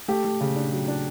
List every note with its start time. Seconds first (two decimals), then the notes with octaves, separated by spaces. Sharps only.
0.08 A3 G4
0.24 A3
0.41 C#3
0.56 D4
0.72 F#3
0.88 D4